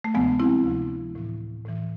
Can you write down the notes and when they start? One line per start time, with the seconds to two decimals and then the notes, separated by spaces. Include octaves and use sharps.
0.04 A3
0.14 D2 C3 F3 G#3 B3
0.40 C4 E4
0.64 D2 C3 F3
1.15 A2 E3
1.65 A2 E3